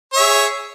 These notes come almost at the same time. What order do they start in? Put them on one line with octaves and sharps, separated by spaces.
C#5 E5 G#4